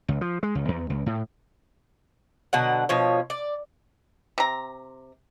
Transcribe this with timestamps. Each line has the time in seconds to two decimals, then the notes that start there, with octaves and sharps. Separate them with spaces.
0.08 C#2
0.21 F3
0.43 G#3
0.55 C#2
0.68 E2
0.90 C#2
1.06 A2
2.53 B2 D3 F#3 F#5
2.89 B2 F3 C#5
3.30 D5
4.38 C3 A#5